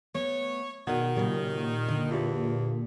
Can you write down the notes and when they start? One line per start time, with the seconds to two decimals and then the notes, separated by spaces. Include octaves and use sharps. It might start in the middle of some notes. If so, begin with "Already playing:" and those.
0.14 A3 B3 C#5
0.87 B2 D#3 F#4 G#4 D5 F#5
1.16 A#2 C#3 F#3 G4
1.88 D3
2.11 E2 F4 G4